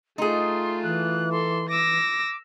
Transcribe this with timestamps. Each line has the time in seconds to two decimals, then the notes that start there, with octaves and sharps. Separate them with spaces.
0.18 A3 D#4 F4 G#4 C6
0.83 E3 F#6
1.32 A4 C6
1.69 D6 E6 A#6